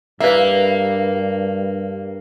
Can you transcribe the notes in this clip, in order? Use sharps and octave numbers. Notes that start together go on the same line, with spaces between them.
G2 A#3 B4 E5